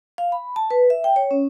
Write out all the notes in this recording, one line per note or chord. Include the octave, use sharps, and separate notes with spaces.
F5
B5
A5
B4
E5
G5
C#5
C#4